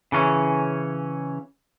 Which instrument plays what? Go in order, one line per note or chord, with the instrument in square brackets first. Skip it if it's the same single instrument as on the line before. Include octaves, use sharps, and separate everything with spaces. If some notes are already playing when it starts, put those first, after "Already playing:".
[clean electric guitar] C#3 E3 C#4